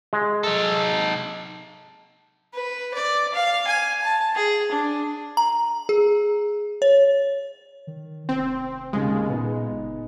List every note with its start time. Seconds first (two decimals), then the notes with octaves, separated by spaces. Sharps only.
0.13 G#3
0.44 D#4 A4
2.54 B4
2.94 D5
3.34 F5
3.67 G#5
4.04 A5
4.35 G#4
4.72 D4
5.37 A#5
5.89 G#4
6.82 C#5
7.87 D#3
8.29 F1 C4
8.93 D#2 C#3 G#3
9.29 A#2 B3 D#4
9.71 F#1